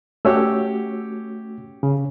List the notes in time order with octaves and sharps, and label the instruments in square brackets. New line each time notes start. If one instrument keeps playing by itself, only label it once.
[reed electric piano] A3 C#4 F#4 [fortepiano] G4 C#5 E6
[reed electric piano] C#3